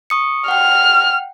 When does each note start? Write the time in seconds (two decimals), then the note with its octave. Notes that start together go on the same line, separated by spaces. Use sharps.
0.10 C#6 D#6 C#7
0.48 F#5 G5 F6